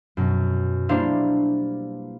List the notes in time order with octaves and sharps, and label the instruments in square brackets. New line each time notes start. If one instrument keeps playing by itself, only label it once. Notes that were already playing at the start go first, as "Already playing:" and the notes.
[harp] F#2 B2
G3 A#3 D4 E4 C5 F5